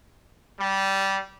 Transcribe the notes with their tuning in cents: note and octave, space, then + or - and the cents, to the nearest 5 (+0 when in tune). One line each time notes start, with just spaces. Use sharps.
G3 -15